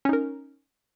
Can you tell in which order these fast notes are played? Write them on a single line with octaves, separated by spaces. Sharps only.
C#4 D#4 A#4